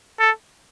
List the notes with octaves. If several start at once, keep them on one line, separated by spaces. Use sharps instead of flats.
A4